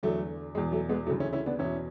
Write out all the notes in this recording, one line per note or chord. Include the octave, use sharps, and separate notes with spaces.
E2 D3 F#3 A3
E2 B2 G#3
F#3 A3
G#3 B3
D2 C#3 E3 F#3 A3
C#4 E4
C#4 E4
B3 D4
E2 B2 C#4 E4